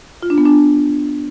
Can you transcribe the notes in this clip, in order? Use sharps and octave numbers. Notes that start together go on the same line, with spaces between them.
F4
D4
B3
D4